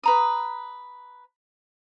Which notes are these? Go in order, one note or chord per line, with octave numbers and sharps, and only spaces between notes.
B4 A#5 D#6